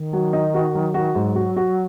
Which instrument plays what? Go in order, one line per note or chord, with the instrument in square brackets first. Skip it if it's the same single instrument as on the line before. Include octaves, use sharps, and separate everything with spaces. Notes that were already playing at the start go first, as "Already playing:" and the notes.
Already playing: [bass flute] D#3
[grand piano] F#3
D#4
F#4
F#3
F#4
[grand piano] G#2 [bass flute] F#3
[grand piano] F#4
F#4